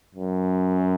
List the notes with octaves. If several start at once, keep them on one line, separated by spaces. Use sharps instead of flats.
F#2